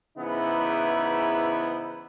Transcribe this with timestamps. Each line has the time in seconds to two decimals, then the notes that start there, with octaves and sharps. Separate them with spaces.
0.18 G#2 C#3 E3 B3 D#4 E4